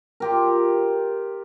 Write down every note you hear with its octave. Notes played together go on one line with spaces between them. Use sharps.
F4 G4 A#4